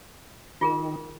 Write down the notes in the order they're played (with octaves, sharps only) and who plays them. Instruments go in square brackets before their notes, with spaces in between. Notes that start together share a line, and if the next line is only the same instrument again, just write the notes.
[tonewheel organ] D#3 [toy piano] F4 G#4 A#4